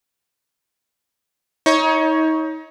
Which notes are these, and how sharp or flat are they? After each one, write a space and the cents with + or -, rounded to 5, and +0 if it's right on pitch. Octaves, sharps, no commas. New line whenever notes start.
D#4 +30 C#5 +0